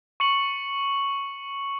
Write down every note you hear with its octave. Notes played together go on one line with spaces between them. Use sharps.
C#6 C#7 F#7